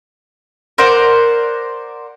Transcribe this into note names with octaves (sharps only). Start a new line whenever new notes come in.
A#4 C5 D5 F#5